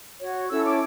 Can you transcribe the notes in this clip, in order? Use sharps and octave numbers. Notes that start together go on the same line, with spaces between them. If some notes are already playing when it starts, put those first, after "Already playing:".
F#4 C#5
C#4 E4 A4 C#5 E6
D6